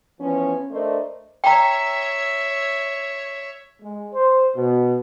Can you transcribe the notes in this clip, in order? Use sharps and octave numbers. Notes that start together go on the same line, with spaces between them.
E3 F3 B3 C#4
A3 D4 A#4 C5 D5 D#5
C#5 E5 G5 A#5
G#3
C5
B2